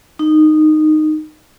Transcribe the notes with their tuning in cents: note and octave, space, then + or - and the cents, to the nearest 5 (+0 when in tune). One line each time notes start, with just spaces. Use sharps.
D#4 -15